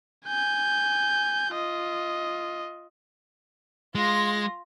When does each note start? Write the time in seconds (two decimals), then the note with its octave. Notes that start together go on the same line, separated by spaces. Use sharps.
0.27 G#5 G6
1.54 F4 D#5
3.95 G#3 F4 A#6